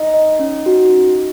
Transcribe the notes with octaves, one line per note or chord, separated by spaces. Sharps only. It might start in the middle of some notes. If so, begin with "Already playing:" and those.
Already playing: D#4
D#5
C#4
F#4